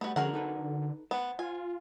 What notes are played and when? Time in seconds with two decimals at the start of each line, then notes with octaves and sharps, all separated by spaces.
0.01 G3 A3 B3 F#4
0.16 D3 F3 C#4 F#4 G#4 A#4 F#5
0.34 D#4 A4 B4
1.11 B3 C5 F#5
1.39 F4 G#5